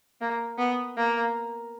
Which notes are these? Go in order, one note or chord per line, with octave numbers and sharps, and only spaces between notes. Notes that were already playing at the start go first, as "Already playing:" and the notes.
A#3
B3
A#3